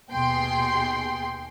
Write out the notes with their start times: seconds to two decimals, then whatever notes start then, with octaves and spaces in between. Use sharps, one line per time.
0.12 D#2 B2 G#4 G5 C6